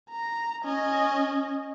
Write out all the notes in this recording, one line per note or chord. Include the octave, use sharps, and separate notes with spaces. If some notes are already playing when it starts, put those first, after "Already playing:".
A#5
C#4 D#5